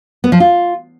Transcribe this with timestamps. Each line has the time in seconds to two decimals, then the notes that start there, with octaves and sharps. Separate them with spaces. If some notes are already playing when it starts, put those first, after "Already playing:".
0.24 B3
0.32 F3
0.40 F4